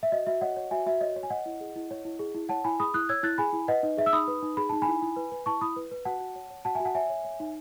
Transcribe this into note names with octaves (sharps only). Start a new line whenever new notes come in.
E5
F#4 D#5
F#4 E5
C#5 D#5 F#5
C#5
F#4 E5 G#5
F#4 E5
C#5 D#5
C#5
G#5
C#5 D#5 F#5
E4
G#4
E4
C#5
E4
G#4
E4
C#5 F#5 A5
E4 G#5 B5
G#4 B5 D#6
E4 D#6 F#6
C#5 E6 G#6
E4 F#6 A6
G#4 G#5 B5
E4
B4 D#5 F#5
D#4 D#5
G#4 E5
E6
D#4 B5 D#6
B4
D#4
G#4 B5
D#4 A5
G#5 B5
E4
E4
B4
B4
E4 A5 C#6
E4 B5 D#6
B4
B4
F#4 F#5 A5
F#4
C#5
C#5
F#4 F#5 A5
E5 G#5
F#4
F#5 A5
C#5 E5 G#5
C#5
C#5
D#4